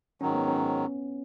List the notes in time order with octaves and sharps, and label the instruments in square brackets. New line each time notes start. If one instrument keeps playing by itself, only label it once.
[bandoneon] G#2 D#3 F#3 [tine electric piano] C#4
[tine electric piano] B3
C#4